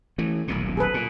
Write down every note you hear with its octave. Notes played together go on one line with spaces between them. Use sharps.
E3 A3
D#1 B1 A#2
G#4 A4 B4
A#2